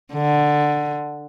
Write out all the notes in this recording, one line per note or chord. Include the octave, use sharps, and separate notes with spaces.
D3